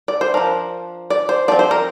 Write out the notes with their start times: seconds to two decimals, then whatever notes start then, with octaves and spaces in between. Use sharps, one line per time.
0.08 D5
0.21 C5
0.34 F3 D4 A#4
1.10 D5
1.29 C5
1.48 F3 C4 D5
1.59 C5
1.71 A#4